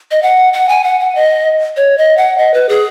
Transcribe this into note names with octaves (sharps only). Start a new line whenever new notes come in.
D#5
F#5
F#5
G#5
F#5
F#5
D#5
C#5
D#5
F#5
D#5
B4
G#4